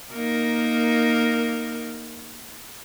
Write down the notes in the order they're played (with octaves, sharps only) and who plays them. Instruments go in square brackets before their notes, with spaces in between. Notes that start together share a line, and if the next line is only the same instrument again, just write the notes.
[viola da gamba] A#3 D#4 A#4